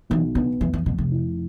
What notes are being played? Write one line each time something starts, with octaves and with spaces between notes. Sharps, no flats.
B1 E3
D3 B3
F1 E3
E3
F1 B2
C3
E4